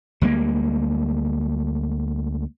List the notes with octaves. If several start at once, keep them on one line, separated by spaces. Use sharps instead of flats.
D2 G3 G#3 A#3